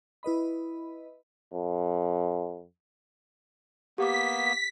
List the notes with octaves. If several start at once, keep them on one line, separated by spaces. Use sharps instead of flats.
E4 B4 D#5 B5
F2
A#3 B3 G4 D6 B6